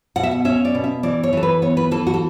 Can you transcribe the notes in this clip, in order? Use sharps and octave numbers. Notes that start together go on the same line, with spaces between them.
B2 F#5
E5
F#5
C#4 E5
D5
B2
E5
E3 D5
C#5
E3 A4
B4
B3 C#5
B4
E3 A4
F#4
A4